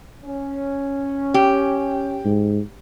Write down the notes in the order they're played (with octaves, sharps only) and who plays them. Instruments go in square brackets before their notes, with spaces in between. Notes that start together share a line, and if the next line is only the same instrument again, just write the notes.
[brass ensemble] C#4
[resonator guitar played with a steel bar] G4
[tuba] G#2